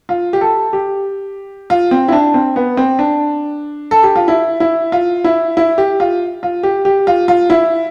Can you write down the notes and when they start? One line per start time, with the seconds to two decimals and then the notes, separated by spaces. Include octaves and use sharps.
0.09 F4
0.33 G4
0.41 A4
0.73 G4
1.70 F4
1.91 C4
2.08 E4
2.12 D4
2.34 C4
2.56 B3
2.77 C4
2.99 D4
3.91 A4
4.03 G4
4.16 F4
4.28 E4
4.60 E4
4.92 F4
5.24 E4
5.57 E4
5.78 G4
6.00 F4
6.43 F4
6.63 G4
6.85 G4
7.07 F4
7.28 F4
7.50 E4